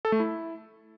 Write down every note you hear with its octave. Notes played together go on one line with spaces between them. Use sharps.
A4
A3
E4